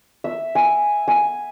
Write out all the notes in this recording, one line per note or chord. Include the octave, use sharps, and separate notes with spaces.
E5
G#5
G#5